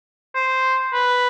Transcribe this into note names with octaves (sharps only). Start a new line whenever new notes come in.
C5
B4